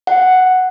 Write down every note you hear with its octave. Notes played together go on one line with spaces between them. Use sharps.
F#5